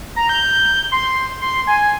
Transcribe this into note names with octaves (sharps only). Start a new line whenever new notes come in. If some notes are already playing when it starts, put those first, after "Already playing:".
A#5
G6
C6
C6
G#5